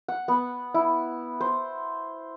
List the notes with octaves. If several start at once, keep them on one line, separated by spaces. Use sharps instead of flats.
F#5
B3
E4
C5